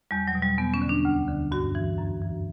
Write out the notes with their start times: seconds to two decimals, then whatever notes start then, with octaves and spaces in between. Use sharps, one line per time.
0.11 E2 G3
0.28 F#3
0.35 B2
0.43 G3
0.58 E2 B3
0.74 C#4
0.82 D3
0.89 D4
1.05 D2
1.28 D3
1.52 G2 F#4
1.75 E3
1.98 F#2
2.22 E3